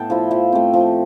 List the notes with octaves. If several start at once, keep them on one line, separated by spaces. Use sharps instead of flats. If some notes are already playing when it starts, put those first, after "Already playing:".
Already playing: A2 B3 G5 A5
F3 A3 E4
F3 E5
A3 C4
F3